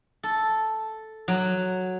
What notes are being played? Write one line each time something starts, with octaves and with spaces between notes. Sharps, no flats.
A4
F#3